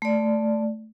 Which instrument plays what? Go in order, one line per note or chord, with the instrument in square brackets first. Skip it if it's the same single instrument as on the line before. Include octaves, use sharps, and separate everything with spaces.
[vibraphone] A3 D5